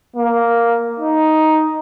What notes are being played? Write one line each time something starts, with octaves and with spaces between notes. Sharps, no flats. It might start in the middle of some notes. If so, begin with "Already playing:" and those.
A#3
D#4